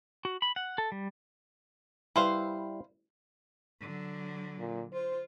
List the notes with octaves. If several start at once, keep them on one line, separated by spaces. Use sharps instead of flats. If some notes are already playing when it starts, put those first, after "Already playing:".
F#4
B5
F#5
A4
G3
G3 E4 B4 C5 F5
D3 F#3
A#2
F4 C5